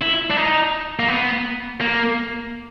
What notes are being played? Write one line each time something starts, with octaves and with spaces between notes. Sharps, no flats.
E4
D4
D#4
A#3
B3
A#3